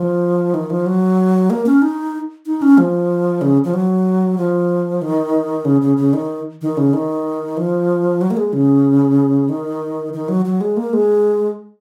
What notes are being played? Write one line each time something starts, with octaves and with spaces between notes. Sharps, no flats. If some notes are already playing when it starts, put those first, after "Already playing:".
Already playing: F3
D#3
F3
F#3
A#3
C#4
D#4
D#4
C#4
F3
C#3
F3
F#3
F3
D#3
C#3
C#3
C#3
D#3
D#3
C#3
D#3
F3
F#3
A#3
G#3
C#3
D#3
D#3
F#3
F#3
G#3
A#3
G#3